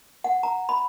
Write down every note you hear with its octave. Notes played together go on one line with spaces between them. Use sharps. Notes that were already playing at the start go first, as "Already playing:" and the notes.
F#5
A#5
B5